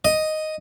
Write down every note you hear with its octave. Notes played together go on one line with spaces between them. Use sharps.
D#5